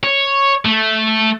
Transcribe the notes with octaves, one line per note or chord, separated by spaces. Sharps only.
C#5
A3